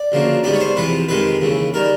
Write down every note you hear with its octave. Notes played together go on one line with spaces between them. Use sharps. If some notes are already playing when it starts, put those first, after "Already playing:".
Already playing: D5
D2 C#3 F3 A#3
G#2 D#3 G3 B3 D5
C#5
C5
E2 C3 F3 B4
F2 C3 D#3 G#3 B4
D#2 C#3 E3
D#3 G3 A#4